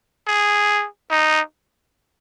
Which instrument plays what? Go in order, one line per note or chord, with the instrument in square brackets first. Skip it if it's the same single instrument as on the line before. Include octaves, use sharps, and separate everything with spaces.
[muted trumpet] G#4
D#4